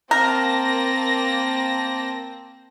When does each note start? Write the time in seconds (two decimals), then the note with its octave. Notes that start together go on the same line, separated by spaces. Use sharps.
0.11 A#3 C4 A#4 A5 A#6